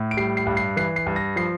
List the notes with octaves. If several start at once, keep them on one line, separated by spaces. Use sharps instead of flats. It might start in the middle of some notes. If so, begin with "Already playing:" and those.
Already playing: A2
D7
G3 C7
C7
G2
C7
E3 C7
C7
G2
A#6
F3 C7